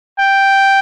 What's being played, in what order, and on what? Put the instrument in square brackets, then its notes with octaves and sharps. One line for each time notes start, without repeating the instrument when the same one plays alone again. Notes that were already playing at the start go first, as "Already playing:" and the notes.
[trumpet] G5